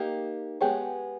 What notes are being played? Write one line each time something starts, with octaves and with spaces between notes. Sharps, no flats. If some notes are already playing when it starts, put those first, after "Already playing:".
Already playing: A#3 D#4 G4
G#3 B3 G4 C#5